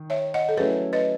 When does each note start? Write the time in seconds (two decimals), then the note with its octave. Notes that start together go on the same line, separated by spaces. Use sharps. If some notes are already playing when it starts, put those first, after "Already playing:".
Already playing: D#3
0.10 C#5 E5
0.34 D#5 F#5
0.49 A4
0.57 F#3 A3 C#4 E4 G#4 B4
0.93 B4 D#5